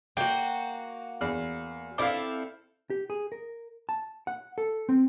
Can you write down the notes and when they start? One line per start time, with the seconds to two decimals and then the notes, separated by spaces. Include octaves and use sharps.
0.17 A#3 F#4 G5
1.21 E2
1.98 C4 E4 A4 D5 F5
2.90 G4
3.10 G#4
3.32 A#4
3.89 A5
4.27 F#5
4.58 A4
4.89 C4